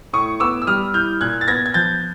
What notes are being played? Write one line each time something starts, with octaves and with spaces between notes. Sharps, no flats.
A2 C#6 D#6
B3 D6 E6
E6
G3 D#6 F6
E4 F6 G6
A#2 F#6 G#6
A6
B3 G#6 A#6
G#6
F3 G6 A6